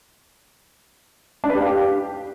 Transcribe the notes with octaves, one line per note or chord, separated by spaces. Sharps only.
D4
B4
G4
F5
G4